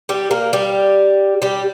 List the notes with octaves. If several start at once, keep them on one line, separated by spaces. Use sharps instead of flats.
G3 G4
A#3 A#4
G3 G4
G3 G4